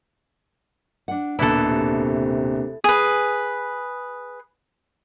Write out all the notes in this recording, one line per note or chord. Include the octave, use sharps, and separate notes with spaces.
D4 F#5
D#1 B2 A#3 D4 E4 A4 B4
C3
G#4 B4